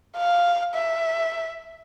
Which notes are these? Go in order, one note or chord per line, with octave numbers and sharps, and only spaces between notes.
F5
E5